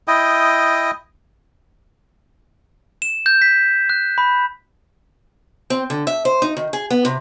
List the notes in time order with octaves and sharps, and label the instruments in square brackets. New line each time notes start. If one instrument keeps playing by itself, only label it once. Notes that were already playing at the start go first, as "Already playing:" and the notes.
[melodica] E4 D#5 G5 D#6
[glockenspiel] E7
G6
B6
F#6
B5
[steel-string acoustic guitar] C4
D3
E5
C5
D#4
D#3
G#4
B3
C3